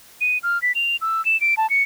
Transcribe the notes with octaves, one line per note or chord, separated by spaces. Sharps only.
D#7
F6
B6
F7
E6
E7
D7
A5
C#7